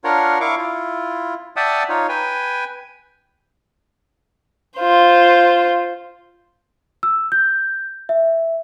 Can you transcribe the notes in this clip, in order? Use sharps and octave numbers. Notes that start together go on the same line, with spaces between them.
D4 F4 A#4 C#5 F#5
E4 F5 C#6 D6
E4 F4
D5 E5 F#5 G5 A5 D#6
D#4 F4 C#5
B4 G5 G#5
F4 C5
E6
G6
E5